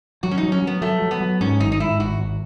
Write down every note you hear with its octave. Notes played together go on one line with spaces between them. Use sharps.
F#3 F#4
C#4
D#4
F#3
C#4
F#3
B3
F#3 A3
F#3
B3
F#3
G#2 C#4
G#1 D#4
D#4
G#2 E4
G#1 F#4
G#1